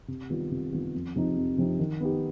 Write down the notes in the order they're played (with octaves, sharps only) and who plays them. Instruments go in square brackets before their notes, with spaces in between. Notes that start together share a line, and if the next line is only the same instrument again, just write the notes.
[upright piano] C3
D#3 G3 B3 F4
C3
D#3 G3 B3 F4
F2
C3 F3 C4 D#4
F2
C3 F3 C4 D#4
D#3
B3 D#4 G4